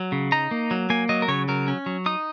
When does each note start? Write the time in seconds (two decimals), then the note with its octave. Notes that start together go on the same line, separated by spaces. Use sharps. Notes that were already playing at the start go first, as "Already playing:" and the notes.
Already playing: F#3
0.12 C#3
0.32 D#4 A#5
0.51 A#3
0.71 F#3
0.90 A#3 G#5
1.09 F#3 D#5
1.22 A#4
1.28 C#3 C#5
1.48 F#3 A#4
1.68 C#4
1.86 F#3
2.06 D#4 D#6